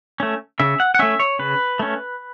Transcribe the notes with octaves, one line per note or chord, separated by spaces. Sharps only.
A3 C#4
C#3 E5
F#5
F#5
A3 C#4 E5
C#5
C#3 B4
A3 C#4